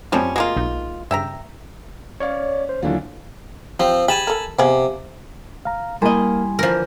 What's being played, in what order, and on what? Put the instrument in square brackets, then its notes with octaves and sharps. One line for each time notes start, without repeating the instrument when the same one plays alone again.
[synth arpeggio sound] F#2 A3 C4 [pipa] F3 G3 C#4
[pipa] G#3 A#3 F4 [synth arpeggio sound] F#4
[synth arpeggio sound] B1 D#4
[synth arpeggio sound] G2 C#3 [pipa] E5 G5 A#5
[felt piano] C#4 F5 [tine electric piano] C#5 D5
[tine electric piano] C5
[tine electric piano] D#2 D3 F#3 [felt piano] E3 D4 F4
[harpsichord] F3 C4 [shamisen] G4
[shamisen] G4 G#4 [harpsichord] G#5 A5 B5
[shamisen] A4 A#4
[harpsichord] C3 [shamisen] F3 B3 G#4
[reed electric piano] F5 A#5
[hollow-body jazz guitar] G3 D#5 [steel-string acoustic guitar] A#3 A#4 [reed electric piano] E4 G#5 C6
[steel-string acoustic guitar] D3 E3 [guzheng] F3 A#4